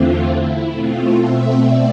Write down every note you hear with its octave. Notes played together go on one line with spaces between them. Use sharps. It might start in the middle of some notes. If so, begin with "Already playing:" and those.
Already playing: E2 D3 A3 C4 F4
E4
B2 A3 C4 F4
E5
D5